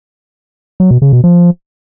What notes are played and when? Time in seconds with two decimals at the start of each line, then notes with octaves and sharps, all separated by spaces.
0.80 F#3
0.91 B2
1.02 C#3
1.13 B2
1.24 F3